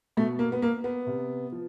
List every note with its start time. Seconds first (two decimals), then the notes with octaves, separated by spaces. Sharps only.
0.17 B2 A3
0.39 A#3
0.52 B3
0.62 A#3
0.84 B3
1.06 C3
1.52 F3